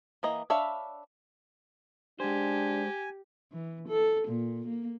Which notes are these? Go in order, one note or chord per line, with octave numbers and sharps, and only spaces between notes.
E3 A#3 D#5
D4 C#5 E5 F5 B5
G#3 D4 G4 C5 G#5
E3
A4
A#2
A#3